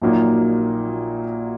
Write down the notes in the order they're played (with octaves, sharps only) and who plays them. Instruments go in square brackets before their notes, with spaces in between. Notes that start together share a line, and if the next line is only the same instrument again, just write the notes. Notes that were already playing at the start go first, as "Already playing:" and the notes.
[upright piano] A#1 A#2 F#3 A#3 D#4